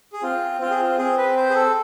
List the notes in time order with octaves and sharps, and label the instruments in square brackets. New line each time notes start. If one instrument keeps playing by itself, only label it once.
[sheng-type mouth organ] G#4
[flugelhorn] C4 [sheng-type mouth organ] F4
[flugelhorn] C4 [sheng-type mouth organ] F4
[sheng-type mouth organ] G#4
F4
[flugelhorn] C4 [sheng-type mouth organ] G#4
[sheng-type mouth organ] B4
C5
G#4
A4